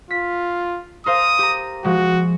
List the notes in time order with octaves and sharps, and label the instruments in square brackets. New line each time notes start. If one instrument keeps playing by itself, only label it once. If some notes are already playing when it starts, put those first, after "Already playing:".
[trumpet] F4 [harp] B6
[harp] A#4 C5 F5 [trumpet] D#6
[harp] G4 A#5
[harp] F3 G#3 [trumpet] F#4